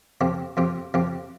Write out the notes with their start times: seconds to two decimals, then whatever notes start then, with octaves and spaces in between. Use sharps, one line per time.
0.21 F2 F3 C4 G4
0.57 F2 F3 C4 G4
0.94 F2 F3 C4 G4